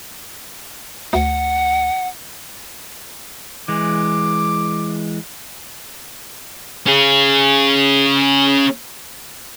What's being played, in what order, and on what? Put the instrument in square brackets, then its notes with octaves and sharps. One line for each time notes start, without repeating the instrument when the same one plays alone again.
[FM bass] D2 [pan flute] F#5
[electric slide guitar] E3 G#3 [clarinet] D6
[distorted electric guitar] C#4 G#4